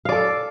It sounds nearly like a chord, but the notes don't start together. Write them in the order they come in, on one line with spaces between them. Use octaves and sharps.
F5 D5 A4